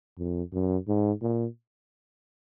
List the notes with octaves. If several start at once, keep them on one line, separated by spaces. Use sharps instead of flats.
F2
F#2
G#2
A#2